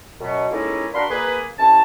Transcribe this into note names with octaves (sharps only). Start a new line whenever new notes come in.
F#2 B2
G#3 A#3 C#4 D#4 E4 A4
D4 F#4 A#4 F5 B5 C6
A#3 G#4 B4
C2 C#4 E4 A5